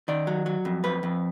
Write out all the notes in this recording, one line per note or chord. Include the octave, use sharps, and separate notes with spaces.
D#3 D5
F#3
F#3
F2
F2 B4
F2